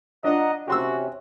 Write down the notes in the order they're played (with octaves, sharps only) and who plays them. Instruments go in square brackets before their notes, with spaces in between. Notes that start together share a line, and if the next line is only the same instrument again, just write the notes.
[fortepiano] D4 F4 [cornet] D#5 [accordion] F#5 A#5
[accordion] C3 C#4 [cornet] F#4 [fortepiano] G4 C6 E6